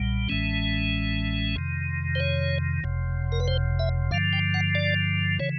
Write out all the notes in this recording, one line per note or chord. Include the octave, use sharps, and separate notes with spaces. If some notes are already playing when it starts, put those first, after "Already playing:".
Already playing: B1 A#2 G3
A1 A2 E3 G#3 C#4
F2 C3 D#3
C5
C#5
F#1 F2 C3
A#4
B4
C5
E5
G2 D3 F3 F5
G5
F#5
D5
C#3 E3 C#5